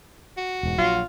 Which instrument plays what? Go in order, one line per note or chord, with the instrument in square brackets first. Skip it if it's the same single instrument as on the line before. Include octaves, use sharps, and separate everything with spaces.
[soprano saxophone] F#4
[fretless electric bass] E1 G#2
[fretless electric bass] A#1 F#3 [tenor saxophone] F4